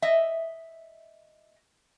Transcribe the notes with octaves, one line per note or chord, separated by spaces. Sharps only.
D#5 E5